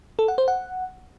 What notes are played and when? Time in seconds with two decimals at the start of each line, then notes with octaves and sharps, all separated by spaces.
0.19 A4
0.28 F#5
0.38 C5
0.48 F#5